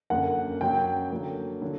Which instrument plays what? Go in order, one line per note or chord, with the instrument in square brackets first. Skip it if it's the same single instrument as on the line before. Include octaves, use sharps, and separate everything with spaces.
[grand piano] F#2 D3 A#3 [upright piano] F#5
[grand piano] C#3 F#3 A#3 [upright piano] G5
[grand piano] D3 F#3 A#3
D3 F#3